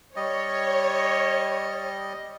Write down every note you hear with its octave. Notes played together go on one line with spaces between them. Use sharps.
G3 C#5 D#5